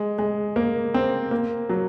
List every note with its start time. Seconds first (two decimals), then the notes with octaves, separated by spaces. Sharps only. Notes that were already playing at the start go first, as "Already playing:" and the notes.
Already playing: G#3
0.19 G#3
0.56 A#3
0.94 C4
1.31 A#3
1.69 F#3